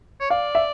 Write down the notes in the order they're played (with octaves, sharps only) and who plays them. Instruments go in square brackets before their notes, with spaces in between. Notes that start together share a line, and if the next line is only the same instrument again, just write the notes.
[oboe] C#5
[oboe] D5 [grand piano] F5
[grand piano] E5